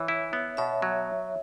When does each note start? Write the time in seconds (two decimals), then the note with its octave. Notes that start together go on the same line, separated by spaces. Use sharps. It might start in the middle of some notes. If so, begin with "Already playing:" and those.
Already playing: E3 C#5 E5
0.08 E4
0.33 B3
0.57 B2 C#5 E5
0.82 F#3